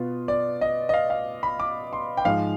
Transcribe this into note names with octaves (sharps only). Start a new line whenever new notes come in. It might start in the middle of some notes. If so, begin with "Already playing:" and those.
Already playing: B2 B3 F4
D5
D#5
D#5
F5
F5
B5
D6
C6
G5
G#2 F3 G#3 F5